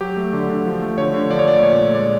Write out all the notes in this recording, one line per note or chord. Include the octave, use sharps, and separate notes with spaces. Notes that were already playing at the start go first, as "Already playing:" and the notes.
F#3 G4
A3
D3
D3
F3
A3
D3 C#5
D3
F3 D5
C#5
A3 D5
A#2 C#5
A#2
G#3 D5